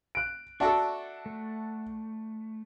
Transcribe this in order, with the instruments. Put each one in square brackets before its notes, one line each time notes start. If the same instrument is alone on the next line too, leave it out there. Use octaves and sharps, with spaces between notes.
[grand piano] F#6 D7
[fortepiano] D4 F#4 A4 [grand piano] E5 F#5 A5 [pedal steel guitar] C#6
[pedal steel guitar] A3